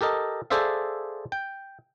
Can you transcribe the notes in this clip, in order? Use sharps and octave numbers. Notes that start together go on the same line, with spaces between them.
G4 A4 A#4 D#5
G#4 A4 C5 D5 E5 F5
G5